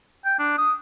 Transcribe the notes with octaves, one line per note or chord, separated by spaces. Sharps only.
G5
D4
D#6